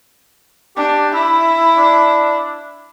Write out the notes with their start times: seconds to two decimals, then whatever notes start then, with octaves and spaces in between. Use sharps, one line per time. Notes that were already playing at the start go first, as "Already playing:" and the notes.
0.77 D4 G4
1.14 E4 E5
1.77 D4